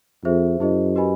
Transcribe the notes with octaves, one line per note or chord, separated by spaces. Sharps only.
F2 G#4 C5 E5
F#2 E4 G#4 C5 D#5
G4 B4 D#5 G#5 B5